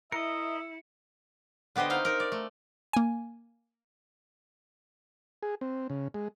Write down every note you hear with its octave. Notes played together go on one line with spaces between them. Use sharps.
E4 A#4 D#5 E5 C#7
D3 B3 G4 C5 D#5
C4 D#4 F5
D#4 A#4
D5
A3
A#3 G#5
G#4
C4
C#3
G#3